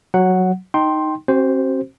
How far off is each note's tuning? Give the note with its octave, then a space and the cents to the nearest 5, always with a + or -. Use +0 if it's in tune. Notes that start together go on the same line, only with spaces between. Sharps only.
F#3 +0 F#5 +0
D#4 -5 G5 -10 C6 +10
C4 +45 F#4 +40 C5 +0